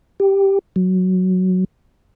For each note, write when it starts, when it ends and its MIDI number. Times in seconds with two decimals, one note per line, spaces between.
0.20 0.59 67
0.76 1.64 54